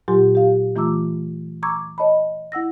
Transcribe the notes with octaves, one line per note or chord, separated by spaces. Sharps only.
A#2 F#3 F4 G4 G#5 C6
G4 F5
E3 A3 F4 A#5 D6 E6
A#5 C#6 D6 E6 G#6
C#5 D#5 A5 B5
E4 F#5 E6 A#6